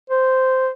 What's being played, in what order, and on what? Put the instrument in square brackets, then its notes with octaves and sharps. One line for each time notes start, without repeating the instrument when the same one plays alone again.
[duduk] C5